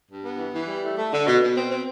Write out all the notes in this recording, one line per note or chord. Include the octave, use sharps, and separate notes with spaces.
G2
B3
E3
E3
G3
A3
A3
D3
B2
B2
C4
C4